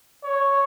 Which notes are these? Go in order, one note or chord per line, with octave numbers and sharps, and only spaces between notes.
C#5